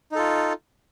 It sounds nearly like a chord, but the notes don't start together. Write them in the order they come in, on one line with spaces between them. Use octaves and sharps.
D#4 A4 F4